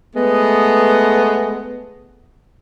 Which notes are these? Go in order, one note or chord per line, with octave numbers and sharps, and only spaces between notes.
G#3 A3 B3